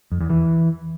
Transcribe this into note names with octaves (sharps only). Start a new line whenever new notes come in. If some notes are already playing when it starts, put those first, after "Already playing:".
F2
E2
E3